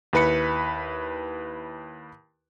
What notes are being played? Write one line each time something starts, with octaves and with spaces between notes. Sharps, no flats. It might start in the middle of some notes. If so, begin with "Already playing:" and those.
D#2 E4 B4 B5 C#7